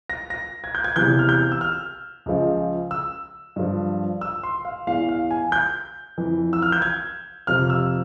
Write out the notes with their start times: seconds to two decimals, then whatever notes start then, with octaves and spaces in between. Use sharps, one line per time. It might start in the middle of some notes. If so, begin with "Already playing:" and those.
0.10 A#6
0.30 A#6
0.64 G#6
0.75 G6
0.84 G#6
0.96 E2 C3 E3 G6
1.19 F6
1.29 G6
1.52 E6
1.61 F6
2.26 C#2 C#3 F3
2.91 E6
3.56 G2 F3
4.21 E6
4.43 C6
4.65 F5
4.87 E2 E3 F5
5.09 F5
5.31 G#5
5.52 G6
6.18 F2 E3
6.53 E6
6.62 F6
6.72 G6
6.82 G#6
7.47 F2 C3 F3 F6
7.70 E6